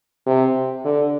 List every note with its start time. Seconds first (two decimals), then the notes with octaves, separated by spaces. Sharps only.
0.27 C3
0.85 D3